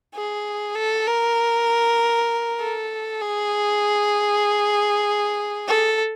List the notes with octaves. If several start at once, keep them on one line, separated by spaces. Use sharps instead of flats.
G#4
A4
A#4
A4
G#4
A4